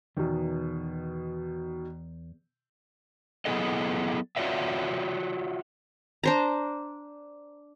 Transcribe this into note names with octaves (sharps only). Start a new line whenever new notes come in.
E2 B2 D#3
F#3 B3 E4 G#4 A4 D#5
F4 F#4 C#5 D5 E5
D4 C5 A#5